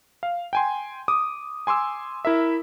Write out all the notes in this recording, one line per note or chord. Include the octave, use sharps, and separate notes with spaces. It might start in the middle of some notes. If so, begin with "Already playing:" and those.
F5
G5 G#5 C6
D6 D#6
G#5 C6 D6 E6
E4 A#4 E5